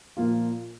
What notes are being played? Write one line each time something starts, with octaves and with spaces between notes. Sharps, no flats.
A#2 F3 A#3 F4